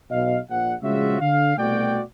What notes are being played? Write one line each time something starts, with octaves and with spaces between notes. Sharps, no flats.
B1 B2 D#5 F5
A#1 F#5
A#1 C#3 G#3 F4 F#4 E5
D3 F5
C2 B2 A3 F#4 D5 G5